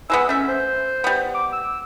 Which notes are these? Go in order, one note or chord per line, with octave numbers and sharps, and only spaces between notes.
E3 G#3 B3 E6
A3 C#4 E5
C5
G3 B3
D6
E6